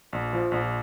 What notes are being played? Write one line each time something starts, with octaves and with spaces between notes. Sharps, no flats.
A#1
F3
A#1